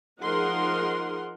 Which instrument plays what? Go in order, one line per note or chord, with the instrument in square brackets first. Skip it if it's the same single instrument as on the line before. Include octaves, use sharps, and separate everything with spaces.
[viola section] F3 D#4 G#4 A#4 F#5 C6